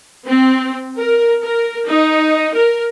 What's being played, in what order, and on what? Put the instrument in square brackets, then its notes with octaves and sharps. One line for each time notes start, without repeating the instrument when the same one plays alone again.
[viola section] C4
A#4
A#4
D#4
A#4